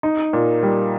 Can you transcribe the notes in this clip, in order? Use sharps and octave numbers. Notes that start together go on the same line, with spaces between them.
D#4
A#2
G3